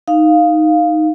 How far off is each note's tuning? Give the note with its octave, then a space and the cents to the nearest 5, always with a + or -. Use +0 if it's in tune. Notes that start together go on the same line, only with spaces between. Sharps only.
D#4 +0 F5 +0